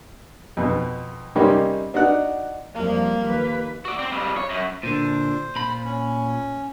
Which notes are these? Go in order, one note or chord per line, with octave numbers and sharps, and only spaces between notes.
F2 B2
C3 G3 A#3 C4 C#4 D#4
D4 D#4 F#4 F#5
F2 F3 G3 A#3
D#2 B4
F#4 D5
C4
F2 G3
C#5
F#2
A#2 D3 C5
A#2 B5
C#4